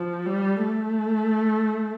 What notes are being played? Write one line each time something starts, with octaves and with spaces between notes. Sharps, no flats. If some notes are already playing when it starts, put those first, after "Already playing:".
Already playing: F3
G3
A3